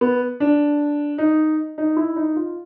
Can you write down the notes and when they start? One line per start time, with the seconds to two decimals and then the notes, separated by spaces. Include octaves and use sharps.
0.01 B3
0.40 D4
1.18 D#4
1.78 D#4
1.97 E4
2.16 D#4
2.36 F4